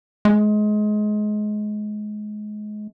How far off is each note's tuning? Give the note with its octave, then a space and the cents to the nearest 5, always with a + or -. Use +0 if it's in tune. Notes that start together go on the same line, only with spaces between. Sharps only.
G#3 +25